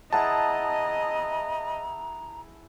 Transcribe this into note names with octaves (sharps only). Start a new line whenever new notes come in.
E4 G#4 D#5 F#5 A5 A#5